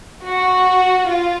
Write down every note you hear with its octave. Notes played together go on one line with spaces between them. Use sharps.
F#4
F4